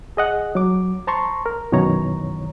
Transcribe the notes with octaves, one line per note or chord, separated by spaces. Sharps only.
G#4 D#5 F#5
F#3 D6
C5 A5 A#5 C6 C#6
A#4
F#2 B2 D#3 E3 C#5 A#5